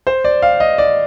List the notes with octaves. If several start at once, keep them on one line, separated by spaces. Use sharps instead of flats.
C5
D5
F5
D#5
D5